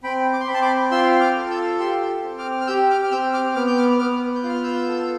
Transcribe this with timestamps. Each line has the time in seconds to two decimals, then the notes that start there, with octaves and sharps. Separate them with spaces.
0.04 C4 G5 B5
0.33 D6
0.40 C6
0.47 C4 B5
0.54 A5 C6
0.62 B5 D6
0.91 F4 C6 E6
1.20 D6 F6
1.36 A4
1.50 E6 G6
1.79 G4 C6 E6
2.23 C4
2.38 D6 F6
2.61 F6
2.67 G4 E6 G6
2.90 D6 F6
3.03 F6
3.11 C4 E6 G6
3.33 D6 F6
3.55 B3 D6 F6
3.67 G6
3.77 D6 F6
3.99 B3 D6 F6
4.35 G6
4.43 F4
4.49 F6
4.63 E6 G6
4.88 A4